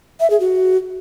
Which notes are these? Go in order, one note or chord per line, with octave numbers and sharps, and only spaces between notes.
E5
G#4
F#4